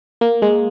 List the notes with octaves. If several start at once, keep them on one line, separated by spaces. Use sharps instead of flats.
A#3
G#3